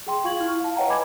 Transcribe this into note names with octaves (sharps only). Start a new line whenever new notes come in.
G#4 G5 C6
F4 F5 C#6 G#6 F#7
E4 F6
F5 A5
B4 C#5 D#5 F#5 G5 A#5
G#5 B5 D6 G#6